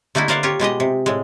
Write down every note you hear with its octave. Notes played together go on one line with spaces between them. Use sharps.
D3 A3 A#3 D#4 E4
A#4 C5 D5 F5 F#5
F4 G4 A#4 C#5
B2 G#3 G4 D#5
C3
A2 G#3